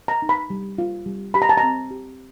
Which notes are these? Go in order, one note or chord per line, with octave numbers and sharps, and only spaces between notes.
A#5
D#4
B5
G3
F4
G3
G4 B5
A#5
A5
A#5
C4
G4